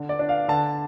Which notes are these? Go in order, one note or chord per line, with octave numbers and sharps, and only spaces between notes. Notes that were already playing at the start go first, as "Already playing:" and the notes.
Already playing: D3
D5
D4
F5
D3 A5